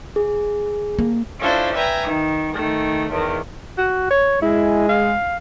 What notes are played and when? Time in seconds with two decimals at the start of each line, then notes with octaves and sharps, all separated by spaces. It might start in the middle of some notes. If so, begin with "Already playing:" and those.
0.16 G#4
0.99 A#3
1.39 C#4 D4 E4 F4 A4 C5
1.74 B4 E5 G5 G#5 A#5
2.04 D#3
2.53 D#3 A3
3.10 E2 D#3
3.78 F#4
4.11 C#5
4.42 G#3 E4
4.89 F5